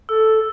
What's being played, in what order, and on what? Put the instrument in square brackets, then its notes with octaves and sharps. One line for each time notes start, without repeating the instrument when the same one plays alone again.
[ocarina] A4 [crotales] E6